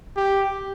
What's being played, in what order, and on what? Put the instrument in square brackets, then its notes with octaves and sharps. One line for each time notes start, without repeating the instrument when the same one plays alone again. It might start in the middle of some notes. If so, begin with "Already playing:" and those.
[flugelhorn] G4